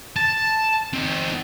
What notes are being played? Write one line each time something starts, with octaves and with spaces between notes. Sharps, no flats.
A5
C4 D#4